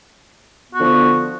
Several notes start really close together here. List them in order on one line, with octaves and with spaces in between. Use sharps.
B3 F#4 D3 F3